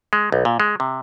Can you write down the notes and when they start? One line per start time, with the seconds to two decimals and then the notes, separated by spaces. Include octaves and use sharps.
0.13 G#3
0.32 B1
0.45 A#2
0.60 G#3
0.80 C3